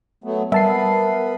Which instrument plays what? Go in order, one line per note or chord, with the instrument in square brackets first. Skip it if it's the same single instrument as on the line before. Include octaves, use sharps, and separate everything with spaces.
[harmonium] F#3 A3 B3
[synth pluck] G3 [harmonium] B3 B4 [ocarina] A#4 [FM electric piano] E5 A5 C7